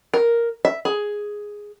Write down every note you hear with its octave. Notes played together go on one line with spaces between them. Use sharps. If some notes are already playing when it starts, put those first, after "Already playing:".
A#4
E5
G#4